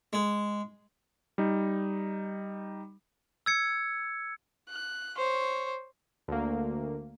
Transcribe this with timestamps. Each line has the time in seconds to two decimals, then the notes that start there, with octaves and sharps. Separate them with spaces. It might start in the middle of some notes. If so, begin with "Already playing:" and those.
0.13 G#3
1.38 G3 D#4
3.46 E6 G#6 C#7
4.69 F#6
5.17 C5 C#5
6.28 D2 A#3